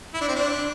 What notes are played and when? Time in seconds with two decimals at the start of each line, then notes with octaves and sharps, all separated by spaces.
0.14 E4
0.21 D4
0.28 C4
0.35 D4